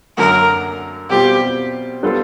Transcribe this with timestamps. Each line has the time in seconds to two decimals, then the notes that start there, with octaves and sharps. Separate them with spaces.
0.17 F#2 D3 F#3 A#3 A#4
1.10 B2 G3 C4 F4 G4
2.03 G3 B3 D4 F4 A4